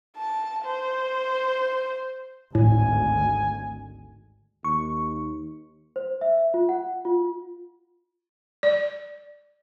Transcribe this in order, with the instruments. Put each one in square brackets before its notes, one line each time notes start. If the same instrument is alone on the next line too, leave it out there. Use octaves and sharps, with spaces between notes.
[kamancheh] A5
C5
[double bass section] G#1 D2 [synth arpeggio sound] A2 [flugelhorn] G#5
[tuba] D#2 [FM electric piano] C#6
[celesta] C5
E5
F4
F#5
F4
[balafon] D5